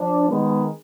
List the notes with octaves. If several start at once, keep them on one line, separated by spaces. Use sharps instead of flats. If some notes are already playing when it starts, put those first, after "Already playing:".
Already playing: F3 D4
D#3 G#3 B3